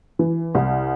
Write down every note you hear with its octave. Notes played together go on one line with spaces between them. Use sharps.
E3
C2